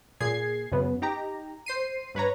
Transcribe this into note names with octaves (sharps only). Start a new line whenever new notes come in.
A#2 G#4 G#6 C7
F#2 C#3 B3
D#4 G4 A#5
C5 C7 D#7
G2 B4 C#5 A#5